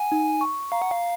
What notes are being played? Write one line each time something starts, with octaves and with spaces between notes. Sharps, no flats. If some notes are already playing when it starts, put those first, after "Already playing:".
Already playing: F#5 G#5
D#4
C#6
F5 A#5
F#5
F5